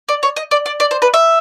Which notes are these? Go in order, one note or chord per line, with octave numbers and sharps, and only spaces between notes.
D5
C#5
D#5
D5
D5
D5
C5
B4
E5